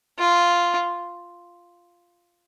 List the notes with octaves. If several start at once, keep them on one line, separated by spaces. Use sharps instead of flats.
F4